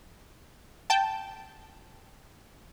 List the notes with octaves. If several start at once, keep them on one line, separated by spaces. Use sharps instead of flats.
G5 A5